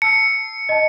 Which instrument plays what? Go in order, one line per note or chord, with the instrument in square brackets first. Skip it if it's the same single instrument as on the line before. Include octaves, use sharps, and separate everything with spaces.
[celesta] A5 E6 C7 [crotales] C#7
[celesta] D#5 A5